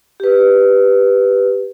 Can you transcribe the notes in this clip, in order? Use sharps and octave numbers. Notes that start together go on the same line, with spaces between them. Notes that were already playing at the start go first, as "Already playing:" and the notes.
G4 B4